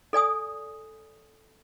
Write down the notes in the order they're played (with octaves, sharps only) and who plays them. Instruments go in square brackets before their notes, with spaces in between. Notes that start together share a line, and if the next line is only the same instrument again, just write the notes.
[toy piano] A4 D5 G#5 D#6